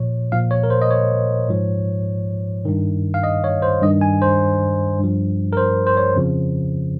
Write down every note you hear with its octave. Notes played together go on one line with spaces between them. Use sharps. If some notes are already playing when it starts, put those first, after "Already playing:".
Already playing: A#2 F3 C#5
A#2 F3 F5
C#5
A#4
C5
D#5
C#5
G#2 F3
G2 D#3
F5
D#5
C#5
C5
G2 D#3 D#5
G#5
C5
G2 F3
A#4
C5
C5
C#5
F2 C#3 F3